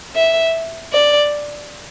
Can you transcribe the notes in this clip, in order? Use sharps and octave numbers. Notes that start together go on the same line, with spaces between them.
E5
D5